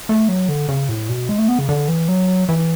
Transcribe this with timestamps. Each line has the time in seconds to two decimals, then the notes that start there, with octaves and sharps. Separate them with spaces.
0.09 A3
0.29 F#3
0.49 D3
0.69 C#3
0.89 A2
1.09 B2
1.29 G#3
1.38 A3
1.48 B3
1.59 C#3
1.69 D3
1.88 E3
2.08 F#3
2.49 E3